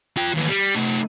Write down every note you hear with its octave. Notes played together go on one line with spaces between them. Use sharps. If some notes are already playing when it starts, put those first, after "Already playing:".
F4 G5
D#2 B3
G3
A3 D#4